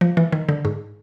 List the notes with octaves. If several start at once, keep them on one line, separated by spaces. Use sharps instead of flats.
F3
E3
D#3
D3
G#2